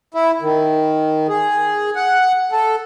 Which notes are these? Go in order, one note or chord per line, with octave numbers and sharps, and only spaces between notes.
E4
D#3
G#4
F#5
A4